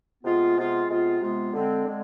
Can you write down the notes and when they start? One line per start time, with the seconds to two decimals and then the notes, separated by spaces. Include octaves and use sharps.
0.24 C3 G#3 B3 F4
0.56 C3 G#3 B3 F4
0.88 C3 G#3 B3 F4
1.20 C3 G#3 B3 F4
1.53 D3 G#3 C4
1.85 D3 G#3 C4